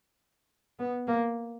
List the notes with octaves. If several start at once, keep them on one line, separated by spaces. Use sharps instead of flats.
B3
A#3